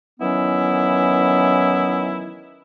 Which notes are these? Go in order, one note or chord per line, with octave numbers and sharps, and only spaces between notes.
D#3 E3 F#3 B3 C#4 E4